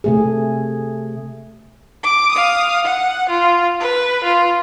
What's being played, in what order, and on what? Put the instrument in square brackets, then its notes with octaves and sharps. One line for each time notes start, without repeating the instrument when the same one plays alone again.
[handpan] C3 A3 G#4
[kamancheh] D6
F5 D#6
F#5
F4
B4
F4